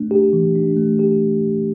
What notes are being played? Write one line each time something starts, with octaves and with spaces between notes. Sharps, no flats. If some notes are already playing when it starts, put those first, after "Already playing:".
Already playing: A3 D4
G4
E3
D4
A3
G4